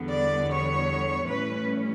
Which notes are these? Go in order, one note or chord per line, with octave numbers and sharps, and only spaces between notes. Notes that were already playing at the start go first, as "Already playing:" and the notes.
Already playing: E2 D3 G3 B3
D5
C#5
A2 E3 G3 C#4 B4